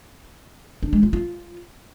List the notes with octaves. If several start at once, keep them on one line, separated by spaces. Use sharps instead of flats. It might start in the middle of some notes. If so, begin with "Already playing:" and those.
D4
G#3
F4
F4